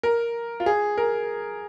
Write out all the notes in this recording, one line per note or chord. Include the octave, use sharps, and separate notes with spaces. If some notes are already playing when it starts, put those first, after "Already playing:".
A#4
F4
G#4
A#4